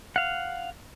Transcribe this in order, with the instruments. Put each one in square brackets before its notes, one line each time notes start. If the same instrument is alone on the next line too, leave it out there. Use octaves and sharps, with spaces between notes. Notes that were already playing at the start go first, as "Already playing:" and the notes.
[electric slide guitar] F5 F#5